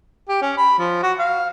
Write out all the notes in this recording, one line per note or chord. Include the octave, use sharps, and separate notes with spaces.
G4
C#4
B5
F3
F#4
F5